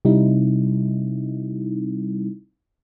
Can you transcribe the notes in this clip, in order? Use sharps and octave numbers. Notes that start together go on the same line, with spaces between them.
C3 G3 C4 D#4 E4